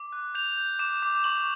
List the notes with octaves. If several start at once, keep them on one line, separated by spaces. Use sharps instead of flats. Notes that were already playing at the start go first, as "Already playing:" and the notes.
Already playing: D6
F#6
G6 F7
G6
D6 E7
D6
C#6 F#7